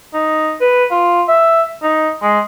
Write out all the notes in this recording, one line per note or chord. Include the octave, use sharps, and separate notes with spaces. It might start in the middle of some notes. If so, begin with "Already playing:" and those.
D#4
B4
F4
E5
D#4
G#3